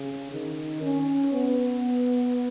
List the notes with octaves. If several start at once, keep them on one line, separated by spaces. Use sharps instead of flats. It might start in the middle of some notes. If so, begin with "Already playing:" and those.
Already playing: C#3
D#3
C#4
B3